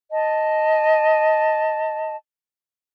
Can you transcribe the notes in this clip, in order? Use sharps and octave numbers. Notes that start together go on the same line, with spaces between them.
D#5 A5